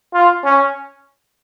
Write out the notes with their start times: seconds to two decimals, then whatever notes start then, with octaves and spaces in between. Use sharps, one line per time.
0.14 F4
0.44 C#4